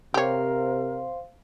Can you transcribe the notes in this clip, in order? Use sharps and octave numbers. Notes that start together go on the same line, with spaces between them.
C3 G4 A#4 C5 C#5 F5 C6